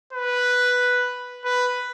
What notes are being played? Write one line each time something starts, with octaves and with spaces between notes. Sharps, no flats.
B4
B4